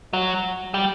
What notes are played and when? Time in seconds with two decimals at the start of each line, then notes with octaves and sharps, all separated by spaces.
0.13 F#3
0.74 G3